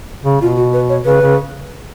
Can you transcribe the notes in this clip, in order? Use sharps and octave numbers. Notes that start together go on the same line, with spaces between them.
C#3
B2 F4
F#4
B4
C#5
C#3 B4
C#3